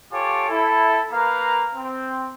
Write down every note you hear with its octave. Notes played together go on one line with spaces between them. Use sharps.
F4 G4 A4 C#5 G#5 D6
E4 A4
A#3 A#4 B4 F5 A#5
C4